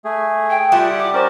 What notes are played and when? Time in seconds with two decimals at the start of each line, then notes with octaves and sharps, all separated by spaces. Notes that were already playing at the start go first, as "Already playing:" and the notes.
0.05 A3 G#4
0.50 G5
0.72 G3 E4 F4 G4 F#5 A5
0.98 D6
1.14 C#4 A#4 C5 D5